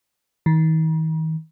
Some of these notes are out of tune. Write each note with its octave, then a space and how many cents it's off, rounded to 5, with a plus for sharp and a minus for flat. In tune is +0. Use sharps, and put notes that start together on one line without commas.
D#3 +40